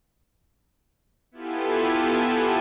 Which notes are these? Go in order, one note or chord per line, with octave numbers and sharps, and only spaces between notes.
B3 E4 F4 G4 A4 G#5